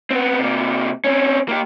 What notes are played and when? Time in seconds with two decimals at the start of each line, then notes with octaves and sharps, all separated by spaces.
0.11 B3 C4
0.39 C3 A#3
1.04 C4 C#4
1.48 A#3 G4